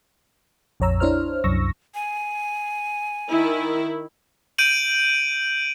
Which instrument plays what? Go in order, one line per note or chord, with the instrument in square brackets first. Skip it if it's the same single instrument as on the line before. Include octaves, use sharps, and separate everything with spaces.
[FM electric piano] A#1 F2 C#5 A#5 E6
D4 E4 C5 C#5 F6
C2 F#2 C#6 E6 A#6
[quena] G#5
[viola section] D#3 E4
[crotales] G6 D7 D#7 F#7